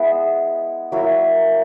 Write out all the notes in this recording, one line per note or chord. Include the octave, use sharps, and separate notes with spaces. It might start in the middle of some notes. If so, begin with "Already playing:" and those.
Already playing: G#3 B3 E4
F#3 A#3 E4 A#4